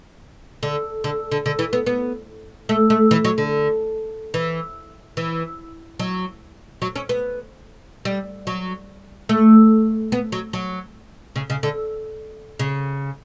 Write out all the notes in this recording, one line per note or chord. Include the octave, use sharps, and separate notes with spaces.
D3
D3
D3
D3
E3
B3
B3
A3
A3
E3
F#3
D3
E3
E3
F#3
F#3
C#4
B3
G3
F#3
A3
B3
F#3
F#3
C#3
C#3
D3
C#3